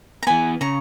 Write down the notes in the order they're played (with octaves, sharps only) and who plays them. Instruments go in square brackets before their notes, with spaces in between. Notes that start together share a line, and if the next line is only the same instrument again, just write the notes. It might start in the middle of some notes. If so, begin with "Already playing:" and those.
[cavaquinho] A#5
[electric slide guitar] E3 B3 [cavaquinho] G#5 B5
[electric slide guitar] C#3 [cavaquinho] A#5 C#6